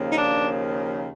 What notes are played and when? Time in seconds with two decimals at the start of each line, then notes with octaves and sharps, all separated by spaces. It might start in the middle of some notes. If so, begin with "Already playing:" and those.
Already playing: D#2 C#3 F3 A#3
0.10 D#4
0.15 D4